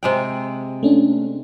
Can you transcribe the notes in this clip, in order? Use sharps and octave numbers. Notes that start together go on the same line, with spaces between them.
C3 G#3 G5
A3 C#4 D4